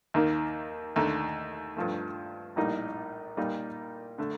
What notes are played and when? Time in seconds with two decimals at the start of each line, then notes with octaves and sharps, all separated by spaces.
0.14 D#2 D#3 A#3
0.96 D#2 D3 A3
1.77 G2 F3 A3
2.56 A#1 A2 G3 A#3 D#4
3.37 A#2 G3 A#3 D#4
4.18 D3 A3